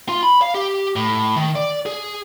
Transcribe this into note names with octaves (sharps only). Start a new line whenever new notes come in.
F4
B5
F5
G4
A2
D#3
D5
G#4